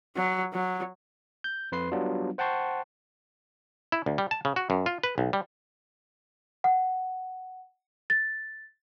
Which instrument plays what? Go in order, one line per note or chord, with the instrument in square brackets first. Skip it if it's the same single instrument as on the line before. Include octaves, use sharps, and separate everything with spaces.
[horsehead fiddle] F#3
F#3
[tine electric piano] G6
F2 B4 C6 C7
F#3 G3 B3 D4 F4
C5 F#5 G5 A5 C6 C#6
[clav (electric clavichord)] E4
D2
G3
A5
C#3
F#4
F#2
F4
B4
B1
G3
[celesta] F#5
A6